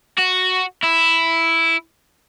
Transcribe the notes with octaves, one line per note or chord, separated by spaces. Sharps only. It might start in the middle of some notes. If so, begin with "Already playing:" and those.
F#4
E4